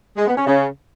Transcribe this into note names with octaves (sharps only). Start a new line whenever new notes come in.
G#3
B3
C#4
C#3